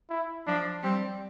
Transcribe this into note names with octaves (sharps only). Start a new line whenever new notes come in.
E4
F3 D4
G3 C4